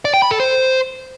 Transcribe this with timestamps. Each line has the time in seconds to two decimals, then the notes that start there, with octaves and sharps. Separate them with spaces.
0.05 D5
0.14 G5
0.22 B5
0.31 A4
0.40 C5